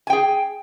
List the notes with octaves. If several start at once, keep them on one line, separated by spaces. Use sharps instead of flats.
G#4 G5 G#5